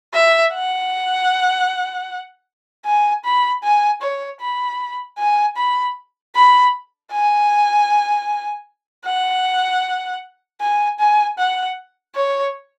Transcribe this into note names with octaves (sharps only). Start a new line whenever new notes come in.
E5
F#5
G#5
B5
G#5
C#5
B5
G#5
B5
B5
G#5
F#5
G#5
G#5
F#5
C#5